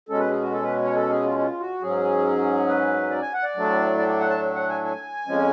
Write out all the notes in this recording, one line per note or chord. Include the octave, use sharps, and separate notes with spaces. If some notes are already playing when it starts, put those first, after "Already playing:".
B2 G#3 C#4 A4
B4
G#4
F#4
A4
B4
C#5
A4
G#4
F4
F4
F#4
G#2 F#3 C#4 G#4
B4
D5
G#5
F#5
D5
A2 F#3 A3 D4
D5
D5
F#5
A5
F#5
G#5
G#5
F2 F3 G#3 C#4